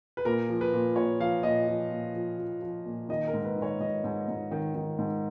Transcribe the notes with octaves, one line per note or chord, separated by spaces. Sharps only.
B4
A#2 A#4
F3
B4
A#2
A#2 C#5
F3 F5
A#2 D#5
F3
A#2
F3
F3
F3
A#2
D#3 D#5
A#4
G#2
B4
D#3
C#5
G#2 D#5
G#2
G#2
D#3
D#3
G#2